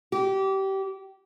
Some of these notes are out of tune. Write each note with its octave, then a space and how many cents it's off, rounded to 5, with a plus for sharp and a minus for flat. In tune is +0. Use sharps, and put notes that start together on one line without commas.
G4 -25